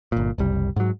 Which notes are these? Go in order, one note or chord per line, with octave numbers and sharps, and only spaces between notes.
G1 A#2
F#1 C2 G3
G#2 F#3